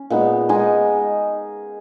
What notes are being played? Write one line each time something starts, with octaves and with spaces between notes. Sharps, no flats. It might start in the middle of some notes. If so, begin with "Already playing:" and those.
Already playing: C#4
A#2 G#3 B3 D#4
G#3 D#4 G#4